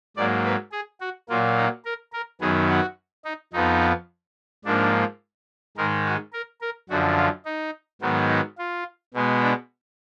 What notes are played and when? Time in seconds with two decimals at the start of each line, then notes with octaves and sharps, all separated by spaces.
0.17 G#2 F#3 A#3 D5
0.44 B4
0.72 G#4
1.00 F#4
1.29 A#2 F#3 A#3 F4
1.57 D#4
1.85 A#4
2.13 A#4
2.41 F#2 D#3 F#3 B3 G#4
2.69 F#4
3.25 D#4
3.53 F2 F3 B3 D#4
4.65 G#2 F3 A#3 D4
5.77 G#2 D#3 G#3 A#4
6.05 F#4
6.33 A#4
6.61 A#4
6.89 F#2 D3 F3 F#4
7.17 F4
7.45 D#4
8.01 G#2 D#3 F#3 B3
8.30 D#4
8.58 F4
9.14 B2 G#3 B3
9.42 D4